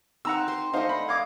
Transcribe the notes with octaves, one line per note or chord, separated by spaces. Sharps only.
C4 D#4 F#5 A#5 E6
C5 C6
A3 D4 D#4 C5 D#5 F5 F#5
B5
F5 D6 D#6 G#6